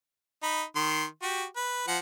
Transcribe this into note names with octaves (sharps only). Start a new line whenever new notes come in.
D#4 B5
D#3 C6
F#4 G4
B4
F3 F#5